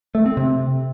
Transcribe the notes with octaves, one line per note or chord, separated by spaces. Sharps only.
A3
C4
C3